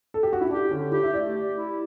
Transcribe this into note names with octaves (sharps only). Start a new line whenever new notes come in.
A4
G4
F#4
E4
D4 G4
D3 C#4
E4 G4
E5
A3 D5
G4
E4